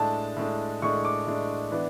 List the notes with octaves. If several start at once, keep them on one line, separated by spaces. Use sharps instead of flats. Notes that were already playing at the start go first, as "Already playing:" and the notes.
Already playing: A2 G#3 D4 A5
A2 G#3 D4
A2 G#3 D4 C#6
D6
A2 G#3 D4
E3 B3 D4